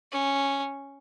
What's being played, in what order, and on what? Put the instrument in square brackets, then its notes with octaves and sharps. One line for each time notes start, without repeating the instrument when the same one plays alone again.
[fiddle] C#4